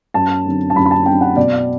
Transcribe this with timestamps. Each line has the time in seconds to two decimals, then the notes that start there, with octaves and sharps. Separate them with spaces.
0.14 F#2 A5
0.45 D3 F#3 C4
0.70 A5
0.75 F#2 B5
0.86 B5
0.91 A5
1.06 D3 F#3 C4 G5
1.21 F#5
1.36 B2 D5